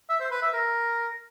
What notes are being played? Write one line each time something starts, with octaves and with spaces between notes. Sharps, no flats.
E5
C5
B4
E5
A#4